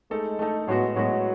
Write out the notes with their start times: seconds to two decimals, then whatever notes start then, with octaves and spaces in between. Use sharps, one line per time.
0.11 G#3 A3 D#4 A4
0.39 A3 D#4 A4
0.68 A2 F#3 G#3 B3 F#4
0.96 A2 F#3 G#3 B3 F#4